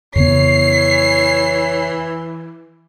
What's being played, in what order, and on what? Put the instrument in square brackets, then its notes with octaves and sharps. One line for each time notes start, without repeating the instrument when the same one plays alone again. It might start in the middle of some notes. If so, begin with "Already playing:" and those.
[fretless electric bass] F2 C#3 B3 [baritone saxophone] E3 [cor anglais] C#5 [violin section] C7